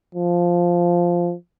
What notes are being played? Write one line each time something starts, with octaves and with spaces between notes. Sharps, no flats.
F3